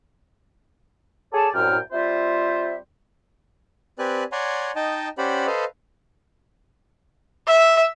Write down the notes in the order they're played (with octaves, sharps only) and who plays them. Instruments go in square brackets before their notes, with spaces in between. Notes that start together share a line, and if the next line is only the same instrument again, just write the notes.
[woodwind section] G#4 A4 C#5 D5 A5
C2 F#2 A2 G5 F6
G3 C4 F4 C5 E5
[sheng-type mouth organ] C4 G4 B4 D5 G#5 F#6
C#5 D5 F#5 G#5 A#5 C6
D#4 D#5 G5 A5
C#4 G4 C5 D5 F#5 B5
A4 B4 C5 D#5 F5
[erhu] E5